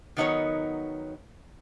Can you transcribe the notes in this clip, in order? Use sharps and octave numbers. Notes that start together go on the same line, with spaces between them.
D#3 F#3 B3 D#4 A#4 C#5